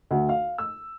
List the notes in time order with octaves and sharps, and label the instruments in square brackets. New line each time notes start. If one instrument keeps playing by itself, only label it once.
[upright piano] D2
F5
E6